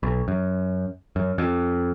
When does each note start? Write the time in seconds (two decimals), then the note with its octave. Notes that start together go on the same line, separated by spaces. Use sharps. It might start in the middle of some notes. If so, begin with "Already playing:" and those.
0.03 B1
0.28 F#2
1.16 F#2
1.38 F2